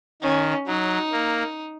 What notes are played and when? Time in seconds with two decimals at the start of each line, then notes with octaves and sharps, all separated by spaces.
0.22 D#3 C#4
0.67 F#3 D#4
1.12 A#3